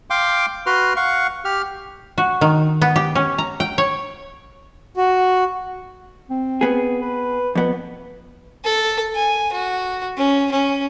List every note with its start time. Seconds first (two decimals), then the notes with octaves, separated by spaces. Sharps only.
0.10 F5 G5 C6 D6
0.66 F#4 B4 C6 F6
0.96 F5 F#5 C#6
1.45 G4 F6
2.18 F#4
2.41 D#3
2.81 B3
2.96 G4
3.15 C#4
3.38 A#5
3.60 G5
3.78 C#5
4.97 F#4
6.30 C4
6.61 B3 G#4
7.01 B4
7.55 F2 B3
8.64 A4
9.15 G#5
9.52 F#4
10.17 C#4
10.51 C#4